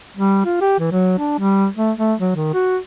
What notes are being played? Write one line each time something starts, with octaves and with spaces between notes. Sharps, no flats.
G3
F4
G4
E3
F#3
D4
G3
A3
A3
F#3
D#3
F#4